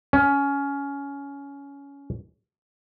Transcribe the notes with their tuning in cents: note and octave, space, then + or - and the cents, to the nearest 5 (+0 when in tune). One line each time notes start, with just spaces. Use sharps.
C#4 +20